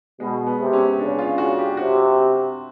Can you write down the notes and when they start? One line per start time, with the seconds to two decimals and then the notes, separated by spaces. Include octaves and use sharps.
0.20 B2 G#3
0.47 B3
0.60 C3
0.73 C#4
0.99 C#3 D4
1.19 F4
1.38 F#4
1.58 G4
1.77 C3 F#4